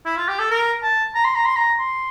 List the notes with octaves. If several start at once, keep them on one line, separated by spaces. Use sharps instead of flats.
E4
F4
G4
A4
A#4
A5
A#5
C6
A#5
C6
A#5
C6